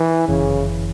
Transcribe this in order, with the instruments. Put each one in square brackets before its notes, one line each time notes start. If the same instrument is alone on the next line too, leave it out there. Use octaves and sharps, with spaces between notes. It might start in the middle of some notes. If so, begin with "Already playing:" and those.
Already playing: [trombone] E3
[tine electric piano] G1 F#2 E3 [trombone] C#3